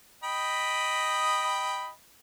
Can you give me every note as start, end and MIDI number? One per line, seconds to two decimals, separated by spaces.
0.24 1.89 75
0.24 1.89 79
0.24 1.89 83